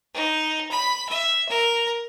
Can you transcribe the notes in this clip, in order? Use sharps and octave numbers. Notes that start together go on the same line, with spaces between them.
D#4
B5
E5
A#4